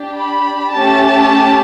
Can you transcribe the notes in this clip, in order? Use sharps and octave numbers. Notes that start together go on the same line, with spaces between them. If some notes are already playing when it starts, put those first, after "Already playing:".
Already playing: D4 G4
B5
A3 C#4 G4 A5